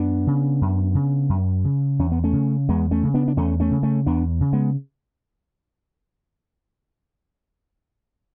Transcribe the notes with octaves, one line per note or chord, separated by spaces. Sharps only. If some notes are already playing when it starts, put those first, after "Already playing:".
Already playing: F#2 B3 D4
C#3
F#2
C#3
F#2
C#3
E2 C#4
B3
A3 C#4
C#3
E2 G#3 B3
A3 C#4
C#3
B3 D4
D4
E2 A3 C#4
A3 C#4
C#3
A3 C#4
E2 B3 D4
C#3
G#3 B3